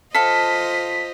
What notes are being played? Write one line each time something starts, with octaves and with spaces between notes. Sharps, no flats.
F4 A4 C5 D#5 F5 B6